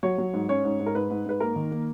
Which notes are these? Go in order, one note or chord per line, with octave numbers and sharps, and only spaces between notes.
F#3 C#5
F#3
G#2
C#4 C#5
G#2
G#2
A#4
G#2 B4
G#2
G#2 B4
A#3 A#4
D#3
A#3